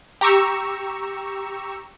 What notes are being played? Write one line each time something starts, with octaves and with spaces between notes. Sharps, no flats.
G4 A#5 C#6 E6